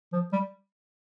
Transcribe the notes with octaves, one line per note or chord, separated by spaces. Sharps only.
F3
G3